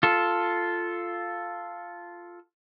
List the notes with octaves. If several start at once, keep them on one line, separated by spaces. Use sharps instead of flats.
F4 A4